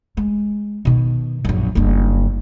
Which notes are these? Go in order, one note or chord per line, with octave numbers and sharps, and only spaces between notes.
G#3
B2 D#3
A#1 F#2
F#1 G2